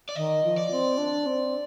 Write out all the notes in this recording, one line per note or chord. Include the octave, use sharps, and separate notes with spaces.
D5
D#3 D#5
F3
D5
C4
D4
C4